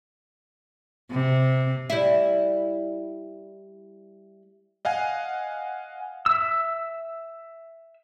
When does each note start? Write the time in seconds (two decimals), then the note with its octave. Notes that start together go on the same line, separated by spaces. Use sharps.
1.11 C3
1.90 G3 E4
4.85 D#5 F5 F#5 G#5
6.26 E5 E6